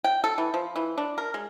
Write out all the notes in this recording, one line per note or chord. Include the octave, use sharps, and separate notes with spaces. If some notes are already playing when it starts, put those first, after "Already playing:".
G5
A4
E3
F3
E3
D4
A#4
G#3